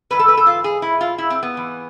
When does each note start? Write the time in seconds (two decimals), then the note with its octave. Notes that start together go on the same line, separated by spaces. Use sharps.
0.10 G#2 E3 B4
0.19 A4
0.28 B4
0.37 A4
0.46 F4
0.64 G#4
0.82 E4
1.01 F4
1.18 E4
1.30 C4
1.43 B3
1.54 G#2 E3